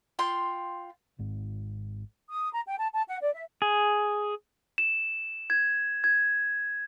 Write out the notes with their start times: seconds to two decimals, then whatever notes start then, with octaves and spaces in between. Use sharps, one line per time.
0.19 F4 G5 C6
1.19 G#1 G#2
2.30 D#6
2.54 A#5
2.67 G5
2.78 A5
2.92 A5
3.08 F#5
3.21 D5
3.34 E5
3.62 G#4
4.78 E7
5.50 G#6
6.04 G#6